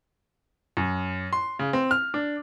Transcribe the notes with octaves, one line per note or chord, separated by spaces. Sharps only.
F#2
C6
C#3
C4
F6
D4